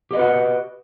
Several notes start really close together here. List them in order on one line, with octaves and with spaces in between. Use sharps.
G4 D#5 B4 F#4